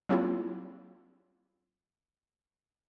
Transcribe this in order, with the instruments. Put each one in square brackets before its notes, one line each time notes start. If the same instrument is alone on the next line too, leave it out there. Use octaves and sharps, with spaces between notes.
[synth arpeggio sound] F#3 A#3 C4 D4 E4 F4